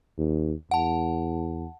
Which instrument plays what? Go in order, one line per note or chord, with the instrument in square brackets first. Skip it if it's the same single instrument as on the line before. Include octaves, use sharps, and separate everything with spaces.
[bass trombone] D#2
[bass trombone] E2 [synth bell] F#5 A5